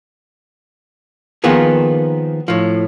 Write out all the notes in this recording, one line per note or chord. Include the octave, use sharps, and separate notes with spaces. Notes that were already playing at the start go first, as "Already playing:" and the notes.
D#3 F3 A#3 B3 F4 G#4
A2 F3